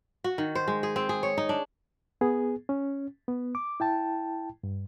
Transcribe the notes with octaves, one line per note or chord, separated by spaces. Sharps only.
F#4
D#3
C5
G#3
G#4
C4
G#4
C#5
D#4
D4
B3 G#4
C#4
B3
D6
E4 G5 A5
G2